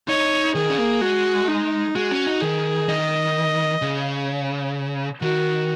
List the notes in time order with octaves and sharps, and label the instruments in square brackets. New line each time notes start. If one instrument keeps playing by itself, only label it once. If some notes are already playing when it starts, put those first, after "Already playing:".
[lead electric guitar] D#4 [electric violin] C#5
[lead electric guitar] D#3 [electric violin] G#4
[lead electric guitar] C#4
A#3
[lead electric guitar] G#3 [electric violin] F#4
[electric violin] D#4
[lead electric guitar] G#3 [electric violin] F#4
[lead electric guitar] C#4
D#4
[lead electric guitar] D#3 [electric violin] G#4
[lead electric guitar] D#3 [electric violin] D#5
[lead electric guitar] C#3
[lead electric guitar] D#3 [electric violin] F#4